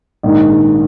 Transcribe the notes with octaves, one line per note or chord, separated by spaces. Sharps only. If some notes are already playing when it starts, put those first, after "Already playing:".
A#1 G#2 D#3